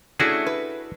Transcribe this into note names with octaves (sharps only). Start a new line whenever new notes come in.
A3 C#4 D4 E4 F#4 G#4
B4